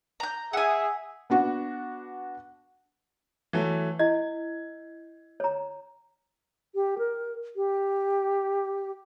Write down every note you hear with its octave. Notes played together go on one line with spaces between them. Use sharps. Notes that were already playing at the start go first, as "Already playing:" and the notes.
A#5 G6
G#4 E5 F#5 G#5
B3 D4 F#4
E3 F#3 A3
E4 D#5 G#6
C#5 A#5
G4
A#4
G4